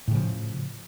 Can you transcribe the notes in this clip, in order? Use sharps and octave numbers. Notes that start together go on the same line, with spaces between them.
A2 C#3 F3